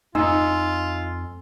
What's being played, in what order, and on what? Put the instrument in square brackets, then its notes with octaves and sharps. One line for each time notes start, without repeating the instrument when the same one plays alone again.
[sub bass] F2 [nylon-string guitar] D#4 [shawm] F4 [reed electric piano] G#5 C6 E6